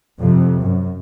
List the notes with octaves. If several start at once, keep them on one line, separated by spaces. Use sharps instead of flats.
F2 C3
F#2